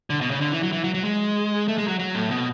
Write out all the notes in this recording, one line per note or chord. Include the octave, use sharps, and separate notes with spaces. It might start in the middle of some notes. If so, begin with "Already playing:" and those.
D3
B2
C#3
D3
E3
F#3
E3
F#3
F#3
G#3
A3
G#3
F#3
F#3
A2
B2